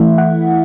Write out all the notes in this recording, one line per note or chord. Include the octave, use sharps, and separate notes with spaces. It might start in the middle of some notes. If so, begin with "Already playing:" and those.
Already playing: E3 A3 E4 E5
F#5